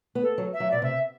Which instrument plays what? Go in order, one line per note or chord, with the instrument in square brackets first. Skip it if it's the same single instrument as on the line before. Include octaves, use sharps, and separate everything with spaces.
[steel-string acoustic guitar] B3
[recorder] A4
[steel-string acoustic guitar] F#3
[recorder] E5
[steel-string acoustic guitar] F#3
[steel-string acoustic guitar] B2 [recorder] D5
[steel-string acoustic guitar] C3 [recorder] E5